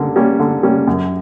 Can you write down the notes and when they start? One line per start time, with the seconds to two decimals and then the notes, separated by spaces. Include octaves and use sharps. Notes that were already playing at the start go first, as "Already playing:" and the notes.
Already playing: D3 G3 A#3 C#4
0.16 G3 A#3 C#4
0.39 D3
0.63 G3 A#3 C#4
0.88 F#2